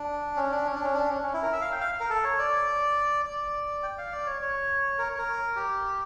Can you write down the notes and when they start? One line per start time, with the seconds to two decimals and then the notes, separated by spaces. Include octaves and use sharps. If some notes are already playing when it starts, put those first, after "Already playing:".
Already playing: D4
0.36 C#4
0.52 D4
0.66 C#4
0.75 D4
0.84 C#4
0.94 D4
1.09 C#4
1.23 C#4
1.34 E4
1.43 A#4
1.53 E5
1.61 F5
1.72 G5
1.81 F5
2.00 A#4
2.10 A4
2.24 C#5
2.39 D5
3.26 D5
3.83 G5
3.98 F5
4.12 D5
4.26 C#5
4.42 C#5
4.98 A#4
5.08 C#5
5.18 A#4
5.56 G4